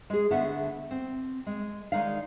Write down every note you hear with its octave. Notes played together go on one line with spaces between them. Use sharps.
G#3 G#4
D3 A3 B3 E5 F#5
C4
G#3
D#3 G#3 D#4 D5 F5